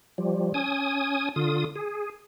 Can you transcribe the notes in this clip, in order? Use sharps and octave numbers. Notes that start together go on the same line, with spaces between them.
F3 G3
C#4 G#5 D#6
D3 F4 D#6
G#4